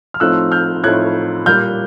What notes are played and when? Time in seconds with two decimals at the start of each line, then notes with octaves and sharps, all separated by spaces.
0.14 F6
0.20 A2 F3 A3 C4 D#4 E6 F#6
0.52 F6 G6
0.83 A2 F3 A3 C4 D#4 F#6 G#6
1.46 A#2 G3 A#3 F6 G6